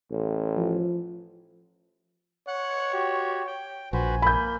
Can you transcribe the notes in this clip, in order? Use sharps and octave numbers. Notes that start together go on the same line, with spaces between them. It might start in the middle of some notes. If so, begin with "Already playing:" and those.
A1
F3
C#5 F#5 F#6
F#4 G4
G5
A#1 F#4 B4 C5 G#5
A#3 B5 G6